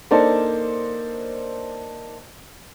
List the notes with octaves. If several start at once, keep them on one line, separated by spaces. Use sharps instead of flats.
A#3 D4 D#4 A4 C5 D5